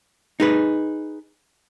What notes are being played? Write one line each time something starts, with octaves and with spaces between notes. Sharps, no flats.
D#4 G#4 B4